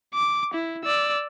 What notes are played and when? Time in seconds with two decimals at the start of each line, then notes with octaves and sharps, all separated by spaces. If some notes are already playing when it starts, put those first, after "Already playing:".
0.15 D6
0.54 E4
0.84 D5 E6